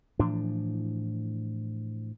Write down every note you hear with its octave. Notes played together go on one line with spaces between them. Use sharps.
A2 E3 F3 D4